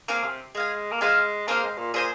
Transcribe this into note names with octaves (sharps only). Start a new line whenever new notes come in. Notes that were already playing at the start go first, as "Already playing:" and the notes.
A#3 C4 G#4 F5 G#5
C3
G#3 G#4 F5 G#5
A#3
G#3 F4 C5 F5 G#5
A#3 C4 G#4 C5 F5
G#3
A#2
A#2 G#4 C5 G#5